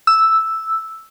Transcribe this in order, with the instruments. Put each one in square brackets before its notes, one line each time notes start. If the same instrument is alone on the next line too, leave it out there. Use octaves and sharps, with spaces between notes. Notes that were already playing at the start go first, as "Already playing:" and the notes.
[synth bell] E6